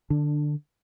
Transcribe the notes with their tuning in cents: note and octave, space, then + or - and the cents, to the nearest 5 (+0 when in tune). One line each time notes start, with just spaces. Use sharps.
D3 +20 D4 +0